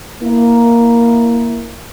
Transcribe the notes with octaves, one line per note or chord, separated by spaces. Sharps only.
A#3 E4